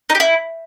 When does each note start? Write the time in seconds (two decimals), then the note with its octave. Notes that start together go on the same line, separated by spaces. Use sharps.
0.10 D#4
0.15 G4
0.20 E4